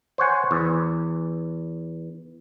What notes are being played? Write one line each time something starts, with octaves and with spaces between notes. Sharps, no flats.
C5 C#5 F#5 G#5
E2